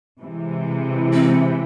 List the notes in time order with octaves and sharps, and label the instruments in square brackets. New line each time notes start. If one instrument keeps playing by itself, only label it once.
[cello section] C3 E3 G#3
[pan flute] C4